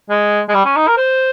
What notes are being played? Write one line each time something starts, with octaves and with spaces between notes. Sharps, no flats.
G#3
G#3
G3
C#4
D#4
A#4
C5